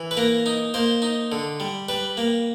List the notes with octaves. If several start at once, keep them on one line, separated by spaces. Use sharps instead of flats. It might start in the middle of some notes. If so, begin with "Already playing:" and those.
Already playing: E3
B4
A#3 A#4
D#4
A#3 C5
D#4
D3
G3
G3 B4
A#3